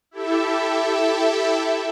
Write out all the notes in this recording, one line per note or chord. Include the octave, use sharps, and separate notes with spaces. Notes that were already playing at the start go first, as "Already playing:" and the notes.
E4 G4 A4 E5